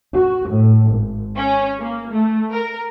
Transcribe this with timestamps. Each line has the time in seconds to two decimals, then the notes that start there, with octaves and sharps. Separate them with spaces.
0.15 F#4
0.50 A2
0.91 G#1
1.36 C#4
1.80 A#3
2.12 A3
2.52 A#4